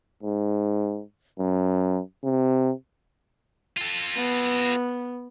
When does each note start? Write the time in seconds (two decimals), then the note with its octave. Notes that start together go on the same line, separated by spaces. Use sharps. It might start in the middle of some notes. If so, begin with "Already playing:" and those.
0.23 G#2
1.39 F#2
2.23 C3
3.77 F4 A4
4.17 B3